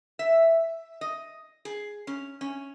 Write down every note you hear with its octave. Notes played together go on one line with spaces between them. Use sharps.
E5
D#5
G#4
C#4
C#4